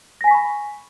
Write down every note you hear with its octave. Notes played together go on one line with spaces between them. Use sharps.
G#5 B5 C#6 A#6 B6